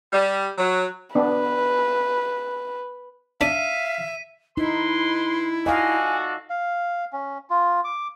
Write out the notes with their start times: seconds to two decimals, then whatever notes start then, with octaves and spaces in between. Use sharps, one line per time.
0.13 G3
0.58 F#3
1.15 B3 D4 B4
3.41 D4 D5 E5 F5 B6 D#7
4.57 D#4 E4 B4 C6
5.66 F#4 A4 D5 D#5 F5 G#5
6.50 F5
7.13 C#4
7.50 F4
7.84 D6